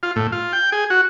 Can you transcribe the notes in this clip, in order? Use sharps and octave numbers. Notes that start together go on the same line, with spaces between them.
F4
A2
F4
G5
G#4
F#4